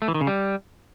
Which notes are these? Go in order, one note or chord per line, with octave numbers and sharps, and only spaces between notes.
A3
E3
D#3
C#3
G3